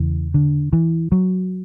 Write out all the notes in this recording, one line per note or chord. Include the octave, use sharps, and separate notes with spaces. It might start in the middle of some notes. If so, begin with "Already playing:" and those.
Already playing: E2 C#3 E3
D3
E3
F#3